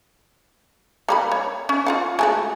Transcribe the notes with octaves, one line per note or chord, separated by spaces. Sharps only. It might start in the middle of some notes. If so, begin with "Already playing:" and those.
G3 A#3 B5
C#5
C#4
F4 F5 F#5
G#3 A3 F#4